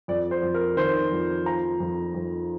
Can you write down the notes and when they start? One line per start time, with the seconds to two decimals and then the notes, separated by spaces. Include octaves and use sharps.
0.08 F2 D5
0.31 C5
0.43 F2
0.54 A#4
0.77 D#3 C5
1.12 F2
1.46 F3 A#5
1.80 F2
2.15 F2